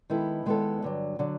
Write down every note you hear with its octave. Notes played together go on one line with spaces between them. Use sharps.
D#3 G#3 B3 E4 A4
D#3 G#3 B3 E4 A4
G2 D3 F#3
D3 F#3